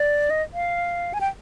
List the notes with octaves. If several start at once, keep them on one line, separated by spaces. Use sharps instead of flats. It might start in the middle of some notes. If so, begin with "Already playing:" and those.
Already playing: D5
D#5
F5
G#5
G5